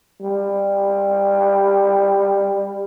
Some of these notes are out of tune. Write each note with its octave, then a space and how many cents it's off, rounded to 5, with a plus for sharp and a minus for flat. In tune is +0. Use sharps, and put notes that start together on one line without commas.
G3 +15